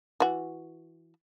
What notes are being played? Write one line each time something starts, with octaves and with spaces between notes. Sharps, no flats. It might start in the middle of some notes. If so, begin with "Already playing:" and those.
E3 F#4